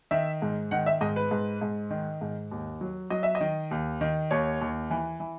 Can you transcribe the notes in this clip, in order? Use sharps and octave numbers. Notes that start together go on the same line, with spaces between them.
D#3 E5
G#2
D#3 F#5
E5
G#2 D#5
B4
G#2
G#2
D#3
G#2
D#2
F#3
F#3 D#5
E5
D#5
D#3
D#2
D#3
D#2 C#5
D#2
E3
E3